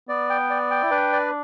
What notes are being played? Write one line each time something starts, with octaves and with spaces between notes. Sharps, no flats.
B3 D5
G5
D5
G5
E4
D4 B4
D5